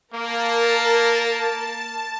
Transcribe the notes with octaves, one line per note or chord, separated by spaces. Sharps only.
A#3 A#4 A5